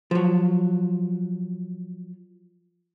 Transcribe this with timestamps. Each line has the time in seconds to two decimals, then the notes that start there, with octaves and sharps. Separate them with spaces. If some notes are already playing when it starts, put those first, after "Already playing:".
0.11 F3 F#3